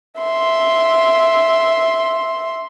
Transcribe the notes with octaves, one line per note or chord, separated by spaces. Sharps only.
E5 C6